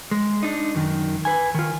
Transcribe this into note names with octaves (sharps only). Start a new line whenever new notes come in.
G#3
D4 D#4
F#2 D#3
B4 G#5
D#3 F4